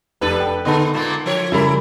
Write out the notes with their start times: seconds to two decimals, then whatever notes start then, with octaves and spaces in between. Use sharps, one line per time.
0.21 F1 D4 A4 B4
0.40 G5
0.65 D3 B3 D#4 A4
0.94 A#2 G#3 A#3
1.26 F3 A#4 C#5
1.52 C#3 F3 G3 E4 A#4